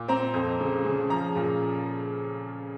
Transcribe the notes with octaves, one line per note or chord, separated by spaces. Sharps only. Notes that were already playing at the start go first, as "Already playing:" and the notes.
Already playing: A#2
C4 A#5
F2
C#3
C#3
F3 A#5
A#2